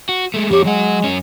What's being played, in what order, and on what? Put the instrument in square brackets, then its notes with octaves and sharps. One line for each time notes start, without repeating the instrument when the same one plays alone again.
[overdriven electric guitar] F#4
G#3 A3
[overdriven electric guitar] F2 C#5 [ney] G4
[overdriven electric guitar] F#3 F#5 [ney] G#3
[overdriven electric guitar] F#2 C#4